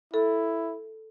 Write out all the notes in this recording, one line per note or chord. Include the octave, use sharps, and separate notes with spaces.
E4 A4